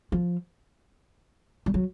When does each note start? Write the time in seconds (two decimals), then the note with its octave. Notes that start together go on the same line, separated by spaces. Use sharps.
0.12 F3
1.66 G3
1.74 F#3